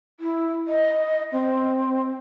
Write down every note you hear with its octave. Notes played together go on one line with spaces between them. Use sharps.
E4
D#5
C4